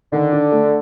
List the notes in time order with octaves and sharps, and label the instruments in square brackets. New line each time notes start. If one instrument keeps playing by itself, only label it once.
[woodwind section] D3 [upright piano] D#3
[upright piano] D4
A3